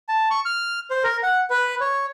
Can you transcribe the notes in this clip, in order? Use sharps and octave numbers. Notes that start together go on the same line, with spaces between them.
A5
C#6
F6
C5
A#4
F#5
B4
C#5